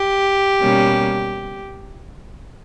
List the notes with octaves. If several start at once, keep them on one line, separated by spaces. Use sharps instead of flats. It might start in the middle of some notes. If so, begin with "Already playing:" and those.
Already playing: G4
B2 G3 A#3 C#4